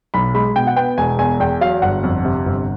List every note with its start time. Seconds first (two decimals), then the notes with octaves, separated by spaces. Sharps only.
0.14 B1 B5
0.34 G#3 B5
0.56 B2 G5
0.67 F#5
0.76 B3 G5
0.98 E1 G#5
1.19 E2 G#5
1.40 E2 G5
1.61 F#3 F5
1.82 G1 F#5
2.04 F2
2.25 C3
2.46 G1